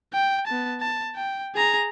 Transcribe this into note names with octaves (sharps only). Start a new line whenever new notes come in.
G5
B3 A5
A5
G5
G#4 A#5